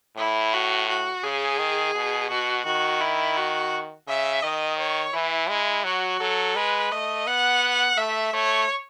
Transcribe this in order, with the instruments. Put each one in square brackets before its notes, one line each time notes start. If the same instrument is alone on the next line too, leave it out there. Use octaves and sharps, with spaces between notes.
[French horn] A2 [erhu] E4
[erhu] F#4
F#4
[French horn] C#3 [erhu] G#4
[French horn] D#3
B2
[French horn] B2 [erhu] F#4
[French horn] D#3 [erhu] F#4
[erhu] E4
F#4
[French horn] C#3 [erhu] E5
[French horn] D#3 [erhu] D#5
[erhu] C#5
[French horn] E3 [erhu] E4
[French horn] G#3
[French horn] F#3 [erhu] F#4
[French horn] F#3 [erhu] A4
[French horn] G#3 [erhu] B4
[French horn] A3 [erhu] D#5
[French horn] B3 [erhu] F#5
[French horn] A3 [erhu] E5
[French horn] A3 [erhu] C#5